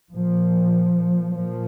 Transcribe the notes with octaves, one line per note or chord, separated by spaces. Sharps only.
A#2 F3
A#2 F3